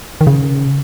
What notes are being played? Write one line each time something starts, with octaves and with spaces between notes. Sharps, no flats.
D#3
C#3